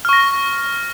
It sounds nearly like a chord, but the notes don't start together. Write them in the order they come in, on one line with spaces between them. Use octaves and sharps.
F6 C#6 A#6